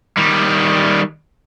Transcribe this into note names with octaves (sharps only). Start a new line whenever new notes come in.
D#3 G3